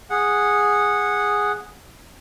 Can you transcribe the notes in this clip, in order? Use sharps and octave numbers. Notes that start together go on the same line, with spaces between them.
G#4 F#5